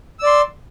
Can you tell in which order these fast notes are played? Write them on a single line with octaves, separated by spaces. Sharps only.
E6 D5 C6